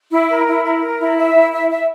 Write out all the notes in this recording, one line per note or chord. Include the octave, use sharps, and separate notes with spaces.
E4
A#4
E4
A#4
A#4
E4
E5
E4
E5
E5